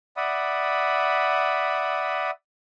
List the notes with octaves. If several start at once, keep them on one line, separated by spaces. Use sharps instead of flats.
D5 E5 F#5 B5 D#6